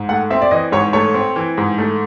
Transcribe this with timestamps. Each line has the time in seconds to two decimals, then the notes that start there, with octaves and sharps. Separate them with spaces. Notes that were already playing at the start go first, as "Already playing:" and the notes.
Already playing: G#2
0.09 A3 F#5
0.30 C4 E5
0.42 D5
0.51 E3 D#5
0.72 G#2 C#5
0.93 A3 C#5
1.14 C4
1.36 E3
1.58 G#2
1.78 A3